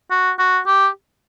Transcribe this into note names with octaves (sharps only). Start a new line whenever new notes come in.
F#4
F#4
G4